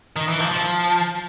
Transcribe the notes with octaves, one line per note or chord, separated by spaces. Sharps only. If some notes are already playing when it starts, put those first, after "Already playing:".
D#3
E3
F3
F3